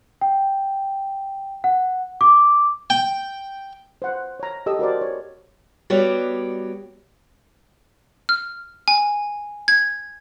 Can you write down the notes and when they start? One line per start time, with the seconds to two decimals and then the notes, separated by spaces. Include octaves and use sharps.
0.21 G5
1.64 F#5
2.21 D6
2.90 G5
4.02 C5 F#5
4.40 C#5 A#5
4.66 G4 A4 D#5 E6
4.79 F#4 A#4 C5 D5
5.01 C#5
5.90 G3 B3 F#4 C#5 D5
8.29 F6
8.88 G#5
9.68 G#6